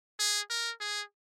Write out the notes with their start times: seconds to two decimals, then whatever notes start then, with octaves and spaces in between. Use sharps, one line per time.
0.19 G#4
0.50 A#4
0.80 G#4